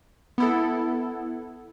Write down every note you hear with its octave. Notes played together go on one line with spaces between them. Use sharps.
B3 E4 A4